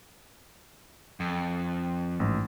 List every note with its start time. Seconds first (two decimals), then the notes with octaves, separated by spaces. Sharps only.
1.20 F2
2.20 A1 G#2